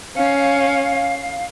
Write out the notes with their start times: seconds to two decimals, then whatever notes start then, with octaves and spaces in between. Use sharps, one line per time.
0.15 C#4 F5